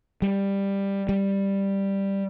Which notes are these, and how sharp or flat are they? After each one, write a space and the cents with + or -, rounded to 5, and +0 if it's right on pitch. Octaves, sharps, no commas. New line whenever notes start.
G3 +10
G3 +5